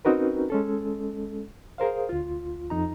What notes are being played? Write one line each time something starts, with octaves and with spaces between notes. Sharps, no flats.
C4 C#4 D#4 F#4 A#4 B4
G#3 C#4 A4
G#4 A#4 C5 F5
D2 F4
F2 D#4 A#5